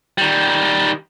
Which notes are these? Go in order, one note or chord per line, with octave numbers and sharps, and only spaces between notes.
D#3 G3